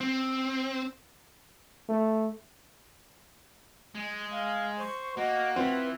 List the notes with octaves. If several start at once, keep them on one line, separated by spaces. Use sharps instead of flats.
C4
A3
G#3
F5
C5 C#6
A#3 F#4 D#5
E3 C4 F4 B4 C5